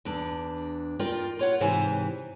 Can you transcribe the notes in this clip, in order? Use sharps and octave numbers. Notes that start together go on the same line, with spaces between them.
E2 D4
F4 A#4 D5 G5
F4 C#5 F#5
G#2 C3 E3 C5 G#5